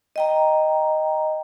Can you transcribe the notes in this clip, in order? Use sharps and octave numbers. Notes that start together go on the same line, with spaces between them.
D#5 G5 A#5